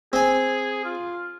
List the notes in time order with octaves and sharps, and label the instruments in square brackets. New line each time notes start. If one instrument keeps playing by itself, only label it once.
[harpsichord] C4 G#5 [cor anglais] G#4
[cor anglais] F4